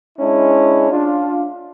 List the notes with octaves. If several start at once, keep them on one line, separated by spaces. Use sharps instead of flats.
G#3 C#4 D4 E4
D4 F4